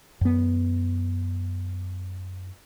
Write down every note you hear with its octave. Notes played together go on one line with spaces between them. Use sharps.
F#2 B3